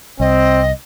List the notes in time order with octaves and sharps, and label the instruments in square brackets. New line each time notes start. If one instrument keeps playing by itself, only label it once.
[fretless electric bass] C2 [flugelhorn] C4 [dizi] D#5